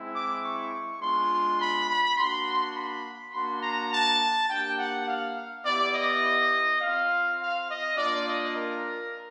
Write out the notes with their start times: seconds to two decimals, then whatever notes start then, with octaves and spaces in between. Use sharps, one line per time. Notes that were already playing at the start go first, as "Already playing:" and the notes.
Already playing: G#3 C4 E4
0.14 D6
0.42 C#6
1.00 G#3 B3 D4 F4 C6
1.59 B5
1.87 B5
2.16 A#3 D4 F#4 C6
2.74 B5
3.32 A#3 D4 F#4 C6
3.61 A#5
3.90 A5
4.48 A#3 D4 G4 G5
4.77 F#5
5.06 F5
5.64 B3 E4 G4 D5
5.93 D#5
6.80 C4 F4 F5
7.38 F5
7.67 D#5
7.97 A#3 D4 F4 D5
8.26 D#5
8.54 A#4